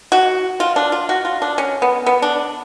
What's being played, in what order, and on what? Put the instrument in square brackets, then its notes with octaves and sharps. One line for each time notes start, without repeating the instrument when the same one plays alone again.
[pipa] F#4
F4
D4
F4
F#4
F4
D4
C#4
B3
B3
D4